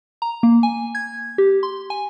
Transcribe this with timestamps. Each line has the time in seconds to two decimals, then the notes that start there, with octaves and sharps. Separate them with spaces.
0.22 A#5
0.43 A#3
0.63 G#5
0.95 G#6
1.38 G4
1.63 C6
1.90 G#5